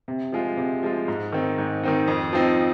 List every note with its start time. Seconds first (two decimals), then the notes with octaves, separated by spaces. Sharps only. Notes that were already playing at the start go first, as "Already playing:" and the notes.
0.08 C3
0.32 F3 G#3 F4
0.57 C3
0.83 F3 G#3 F4
1.08 G#2
1.32 D#3 C4 D#4
1.58 G#2
1.83 D#3 C4 D#4
2.08 F2
2.33 F3 C4 D#4